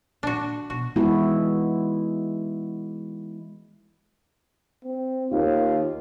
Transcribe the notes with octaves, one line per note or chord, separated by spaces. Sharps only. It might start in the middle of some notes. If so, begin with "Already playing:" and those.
A#2 D4 F#4
B2 F#4
E3 G#3 B3 E4 F#4
C4
D#2 F4